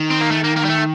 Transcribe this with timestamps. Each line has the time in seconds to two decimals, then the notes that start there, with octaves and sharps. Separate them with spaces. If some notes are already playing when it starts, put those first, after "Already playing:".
Already playing: D#3
0.10 C4
0.21 A#3
0.31 A3
0.44 A#3
0.56 A#3
0.64 G3
0.69 A3